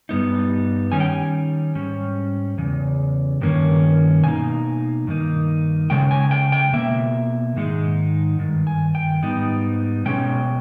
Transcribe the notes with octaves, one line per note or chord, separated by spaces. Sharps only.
G2 G3 B3 D#4
D#3 G3 C#4 G#5
G5
G#5
G#2 G3 C#4
E2 C#3
G2 D#3 A#3 C#4
B2 A#3 D#4 G#5
G2 D#3 A#3 D#4
C#3 G#3 G5
G#5
G5
G5
B2 A#3 E5
G#2 D#3 G#3 D#4
G2 D#3
G#5
G5
G#2 G3 B3 D#4
B2 G#3 C#4 G5